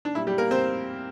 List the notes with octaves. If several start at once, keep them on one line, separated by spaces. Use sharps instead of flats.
D4
A#2 G3 E4
G3 G4
A#3 A#4
C4 C5